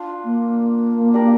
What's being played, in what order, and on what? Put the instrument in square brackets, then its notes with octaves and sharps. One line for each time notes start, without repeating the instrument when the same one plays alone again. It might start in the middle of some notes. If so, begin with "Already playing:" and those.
Already playing: [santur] D4 F4
[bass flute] A#3
[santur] D4 G4 A#4